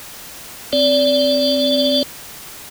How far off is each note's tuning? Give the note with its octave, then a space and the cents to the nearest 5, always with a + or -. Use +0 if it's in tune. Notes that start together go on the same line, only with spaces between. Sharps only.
C4 +0 D5 -25